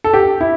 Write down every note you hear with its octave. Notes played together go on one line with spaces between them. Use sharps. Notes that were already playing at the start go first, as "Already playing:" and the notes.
A4
G4
E4